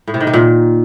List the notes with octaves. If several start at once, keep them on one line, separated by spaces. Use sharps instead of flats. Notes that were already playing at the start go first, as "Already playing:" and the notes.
A2
C3
D#3
C3
A#2